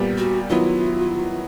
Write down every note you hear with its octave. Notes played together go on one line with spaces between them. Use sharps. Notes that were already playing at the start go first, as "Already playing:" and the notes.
Already playing: A#2 G3 B3
F#4
D#3 F#3 B3 E4 F4